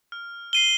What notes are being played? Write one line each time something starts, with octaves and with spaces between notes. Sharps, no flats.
F6
C7 D#7 G7